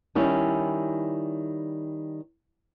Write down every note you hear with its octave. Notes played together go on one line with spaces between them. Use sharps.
D#3 G3 C#4 E4